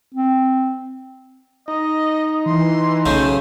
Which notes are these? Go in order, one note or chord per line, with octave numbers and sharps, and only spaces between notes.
C4
D#4 D#5
E3 C6
B1 C#3 A3 C5